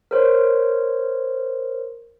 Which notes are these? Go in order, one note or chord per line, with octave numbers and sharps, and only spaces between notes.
A#4 C5 C#5